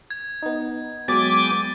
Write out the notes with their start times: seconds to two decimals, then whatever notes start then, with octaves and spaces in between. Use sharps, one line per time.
0.10 G#6
0.42 B3 D#4
1.08 F#3 G#3 B3 G5 G#5 D6 A6